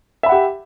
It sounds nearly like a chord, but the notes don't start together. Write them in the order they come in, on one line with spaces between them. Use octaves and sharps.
E5 B5 F#5 G4